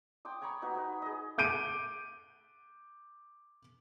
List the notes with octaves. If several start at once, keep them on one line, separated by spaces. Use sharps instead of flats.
G5 C6 D6 D#6
G#5 A#5 B5 C#6
D#4 F#4 B4
D#4 B4
G#4 D#5
D6 G6 D7 D#7